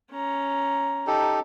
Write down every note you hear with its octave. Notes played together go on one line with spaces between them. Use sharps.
C#4 A#5
D#4 G4 A4